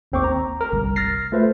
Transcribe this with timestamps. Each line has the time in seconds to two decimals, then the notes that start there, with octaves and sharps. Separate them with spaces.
0.12 G#1 D#2 C4 C5 C#6 D6
0.24 A#5
0.61 A#4 A#5
0.72 G1 C2
0.96 F6 A6 A#6 C7
1.32 A3 F4 B4 C5 E5